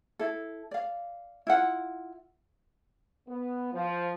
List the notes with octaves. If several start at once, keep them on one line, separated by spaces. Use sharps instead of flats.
E4 A4
D5 F5
E4 F4 F#5
B3
F3